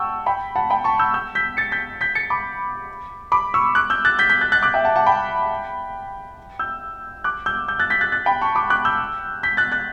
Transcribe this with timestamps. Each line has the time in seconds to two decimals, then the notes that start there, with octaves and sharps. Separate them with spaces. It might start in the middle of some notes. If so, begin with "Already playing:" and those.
Already playing: F#5 G5 A5 C#6 E6
0.26 G5 B5
0.56 F#5 A5
0.70 G5 B5
0.84 A5 C#6
0.99 E6 G6
1.14 E6 G6
1.35 G6 B6
1.57 A6 C#7
1.71 G6 B6
2.01 G6 B6
2.15 A6 C#7
2.30 B5 D6
3.32 B5 D6
3.54 C#6 E6
3.75 D6 F#6
3.90 E6 G6
4.05 F#6 A6
4.19 G6 B6
4.30 G6 B6
4.41 F#6 A6
4.52 F#6 A6
4.63 D6 F#6
4.74 E5 G5
4.84 F#5 A5
4.96 F#5 A5
5.07 G5 B5
6.59 E6 G6
7.24 D6 F#6
7.46 E6 G6
7.68 E6 G6
7.79 F#6 A6
7.90 G6 B6
8.01 F#6 A6
8.12 F#6 A6
8.26 G5 B5
8.41 A5 C#6
8.55 B5 D6
8.70 D6 F#6
8.85 E6 G6
9.43 G6 B6
9.57 F#6 A6
9.72 F#6 A6